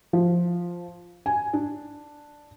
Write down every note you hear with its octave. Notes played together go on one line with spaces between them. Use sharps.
F3
G#5
D4